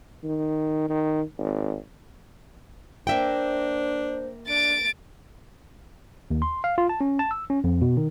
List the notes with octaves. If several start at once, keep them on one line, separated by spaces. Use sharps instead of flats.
D#3
D#3
G#1
A#3 D4 C5 E5 G5
D4 A6 D7
D#2
C6
F5
F4
A5
C#4
A5
E6
C#4
F2
B2
D#3